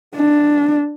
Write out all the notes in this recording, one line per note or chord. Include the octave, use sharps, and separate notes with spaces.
D4